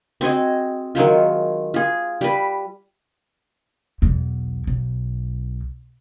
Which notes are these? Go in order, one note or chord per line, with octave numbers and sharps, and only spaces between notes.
C4 F#4 G#4 D#5
D#3 F#3 G#3 F4
F4 G#4
G3 B4
B1 E2
B1